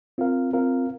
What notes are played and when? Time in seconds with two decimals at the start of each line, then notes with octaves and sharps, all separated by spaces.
0.18 C4 F4 A#4 F5
0.53 C4 F4 A#4 F5